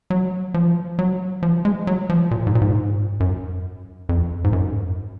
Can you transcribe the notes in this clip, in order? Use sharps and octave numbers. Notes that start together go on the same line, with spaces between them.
F#3
F3
F#3
F3
G#3
F#3
F3
A#2
G#2
A#2
G#2
F#2
F2
G#2
F#2